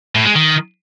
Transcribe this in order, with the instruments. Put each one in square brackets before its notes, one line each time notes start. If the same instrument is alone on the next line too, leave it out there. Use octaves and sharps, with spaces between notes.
[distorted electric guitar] A2
G#3
D#3